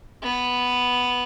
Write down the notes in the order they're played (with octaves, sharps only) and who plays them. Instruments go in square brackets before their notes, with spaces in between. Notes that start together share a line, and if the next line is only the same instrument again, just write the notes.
[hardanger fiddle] B3